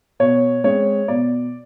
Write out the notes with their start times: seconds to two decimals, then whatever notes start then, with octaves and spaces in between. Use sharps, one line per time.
0.20 B2 C#5
0.64 G#3 C4 C#5
1.08 B2 D5